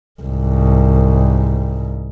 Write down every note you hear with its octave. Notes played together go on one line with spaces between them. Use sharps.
C2 G#2